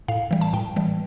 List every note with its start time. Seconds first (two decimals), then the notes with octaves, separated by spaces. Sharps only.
0.08 A2 F5
0.31 E3 G3
0.41 A5
0.53 A2 G5
0.76 E3 G3